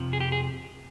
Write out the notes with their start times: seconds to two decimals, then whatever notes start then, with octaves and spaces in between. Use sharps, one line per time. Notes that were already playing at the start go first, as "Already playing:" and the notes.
Already playing: F2 C3 F3
0.13 G#4
0.20 G4
0.32 G#4